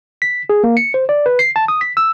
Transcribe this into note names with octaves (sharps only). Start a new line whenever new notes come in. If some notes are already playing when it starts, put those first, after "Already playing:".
B6
G#4
A#3
C#7
C5
D5
B4
C7
A5
D#6
B6
E6